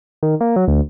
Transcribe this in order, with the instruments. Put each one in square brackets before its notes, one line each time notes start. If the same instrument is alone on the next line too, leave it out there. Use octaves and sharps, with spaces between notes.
[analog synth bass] D#3
A#3
F#3
D2